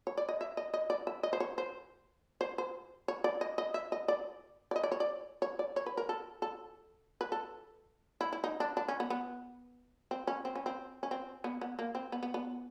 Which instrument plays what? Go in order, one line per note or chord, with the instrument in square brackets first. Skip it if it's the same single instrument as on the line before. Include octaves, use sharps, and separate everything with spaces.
[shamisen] C#5
D5
D#5
E5
D#5
D#5
D5
E5
D#5
C5
C#5
C5
C5
C5
C#5
D5
D#5
D#5
E5
D#5
D5
D5
D#5
D5
C#5
D5
C#5
D5
C#5
B4
A#4
A4
A4
B4
A4
E4
E4
D#4
D4
D4
C#4
B3
B3
C4
C#4
C4
C#4
C4
C#4
C4
B3
B3
A#3
C4
B3
B3
B3